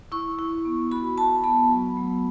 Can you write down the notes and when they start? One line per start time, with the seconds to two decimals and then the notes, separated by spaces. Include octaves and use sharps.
0.12 E4 C#6
0.39 E4
0.65 B3
0.91 F#4 B5
1.18 F#4 A5
1.44 B3 B5
1.71 F#3
1.97 A3